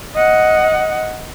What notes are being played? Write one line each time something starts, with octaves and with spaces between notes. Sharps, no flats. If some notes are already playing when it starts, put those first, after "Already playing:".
D#5 F#5